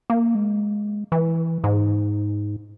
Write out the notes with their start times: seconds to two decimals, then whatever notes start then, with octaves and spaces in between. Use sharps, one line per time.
0.10 A#3
0.35 G#3
1.12 E3
1.64 G#2